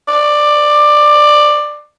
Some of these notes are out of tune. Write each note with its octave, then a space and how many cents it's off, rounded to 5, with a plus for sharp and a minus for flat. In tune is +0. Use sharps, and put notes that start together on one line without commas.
D5 +15